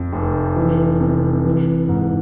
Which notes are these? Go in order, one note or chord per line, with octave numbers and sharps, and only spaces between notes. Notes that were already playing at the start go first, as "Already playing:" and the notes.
Already playing: F2
F1
E3
C3
E3
G#2